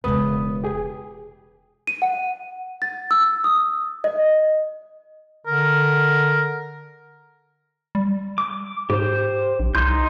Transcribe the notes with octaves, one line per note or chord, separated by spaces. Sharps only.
E1 C#3 B4 D#6
G4 G#4
D#7
F#5
A6
E6
D#6
D#5
D3 A#4
G3
D6
G#2 G4 C5
A#1
C2 D#4 C6 G6